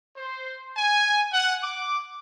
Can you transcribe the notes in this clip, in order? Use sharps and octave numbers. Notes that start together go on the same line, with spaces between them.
C5
G#5
F#5
D6